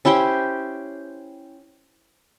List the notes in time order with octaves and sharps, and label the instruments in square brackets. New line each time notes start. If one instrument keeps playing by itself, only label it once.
[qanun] C#4 E4 G4 C5